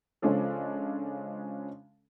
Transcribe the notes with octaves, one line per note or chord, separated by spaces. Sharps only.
C#3 F3 G#3 C#4 D4 A4